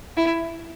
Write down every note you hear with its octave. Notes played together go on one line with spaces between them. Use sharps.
E4